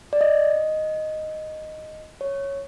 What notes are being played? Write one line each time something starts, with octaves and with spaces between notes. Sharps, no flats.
D5
D#5
C#5